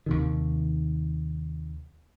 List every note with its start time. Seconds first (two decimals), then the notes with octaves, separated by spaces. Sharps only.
0.06 D#2 C3 D#3